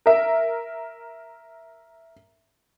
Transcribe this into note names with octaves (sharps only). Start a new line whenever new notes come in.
A#4 E5